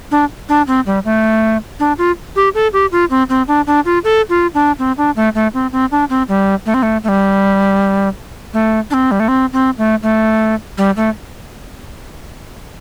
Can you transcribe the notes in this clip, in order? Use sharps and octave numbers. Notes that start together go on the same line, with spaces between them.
D4
D4
C4
G3
A3
D4
F4
G4
A4
G4
F4
C4
C4
D4
D4
F4
A4
F4
D4
C4
D4
A3
A3
C4
C4
D4
C4
G3
A3
C4
A3
A3
G3
A3
D4
C4
G3
A3
C4
C4
A3
A3
G3
A3